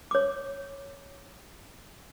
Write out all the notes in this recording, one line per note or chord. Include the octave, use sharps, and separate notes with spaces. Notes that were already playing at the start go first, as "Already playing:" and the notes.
C#5 D6